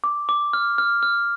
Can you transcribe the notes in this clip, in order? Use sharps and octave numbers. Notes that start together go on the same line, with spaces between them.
D6
D6
F6
F6
F6